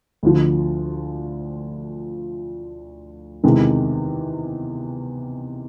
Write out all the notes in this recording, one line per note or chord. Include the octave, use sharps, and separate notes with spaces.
D2 D3 F3
E2 C3 D#3 G#3